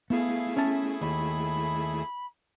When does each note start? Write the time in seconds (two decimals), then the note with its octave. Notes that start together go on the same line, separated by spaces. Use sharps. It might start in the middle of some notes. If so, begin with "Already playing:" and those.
0.10 A3 B3 E4 G#4 F5
0.57 C#4 E5 A5
1.01 D#2 B5